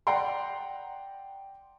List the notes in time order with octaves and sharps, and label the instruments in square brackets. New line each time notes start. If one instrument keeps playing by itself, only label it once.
[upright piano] D5 F#5 G5 A#5 C6